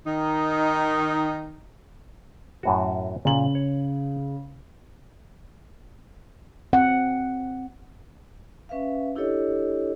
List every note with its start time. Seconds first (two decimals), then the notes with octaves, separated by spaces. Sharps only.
0.05 D#3 D#4
2.63 F#2 A2 F#4
3.25 A#2 C#3 F#7
3.55 C#5
6.73 C4 F#5
8.69 C#4 B4 E5 F5
9.16 D4 E4 G4 A4 C#5 D#5